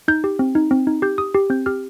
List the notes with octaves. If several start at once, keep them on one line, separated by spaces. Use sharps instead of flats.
D#4 G6
G4
C4
D#4
C4
D#4
G4 G6
G4 D#6
G4
C4 G6
G4 F6